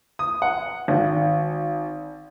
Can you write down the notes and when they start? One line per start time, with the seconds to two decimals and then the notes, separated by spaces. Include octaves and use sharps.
0.19 D#6
0.42 F#5
0.88 G#1